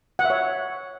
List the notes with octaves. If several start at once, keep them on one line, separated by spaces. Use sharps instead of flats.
F#5
E5
C#5